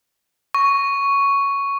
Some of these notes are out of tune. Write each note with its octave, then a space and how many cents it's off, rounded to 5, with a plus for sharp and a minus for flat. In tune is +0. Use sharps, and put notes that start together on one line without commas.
C#6 +5